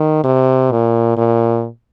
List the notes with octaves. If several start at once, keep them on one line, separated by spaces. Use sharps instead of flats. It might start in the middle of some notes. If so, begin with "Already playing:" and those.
Already playing: D#3
C3
A#2
A#2